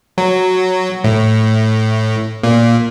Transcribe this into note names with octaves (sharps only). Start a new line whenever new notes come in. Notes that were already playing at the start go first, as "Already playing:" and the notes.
F#3
A2
A#2